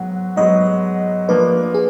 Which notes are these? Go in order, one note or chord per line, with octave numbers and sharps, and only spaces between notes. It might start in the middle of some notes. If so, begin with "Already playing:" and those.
Already playing: G#2 F#3 B3 F#5
G#2 F#3 B3 D#4 D#5
F3 A#3 D4 B4
G#4